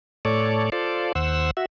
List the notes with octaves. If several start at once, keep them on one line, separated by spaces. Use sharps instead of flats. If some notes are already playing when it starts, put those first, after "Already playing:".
A2 A4 C#5 D5
F4 A4 C5 D5
D#2 C5 F#5 E6
F#4 E5